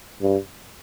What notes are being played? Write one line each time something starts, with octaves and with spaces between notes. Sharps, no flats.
G2